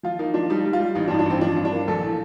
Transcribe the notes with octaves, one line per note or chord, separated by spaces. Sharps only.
F3 F4
A#3 D#4
F3 D4
G3 D#4
G3
F4
G3
A1 D#4
D4
G2 D#4
D4
A1 C4
F3 D4
G2
D4
A#3
A#1 A4
A2